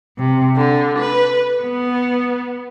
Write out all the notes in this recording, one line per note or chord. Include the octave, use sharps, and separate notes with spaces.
C3
D3
B4
B3